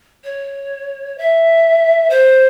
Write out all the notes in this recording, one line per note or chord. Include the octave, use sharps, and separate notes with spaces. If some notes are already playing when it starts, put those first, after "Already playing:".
C#5
E5
C5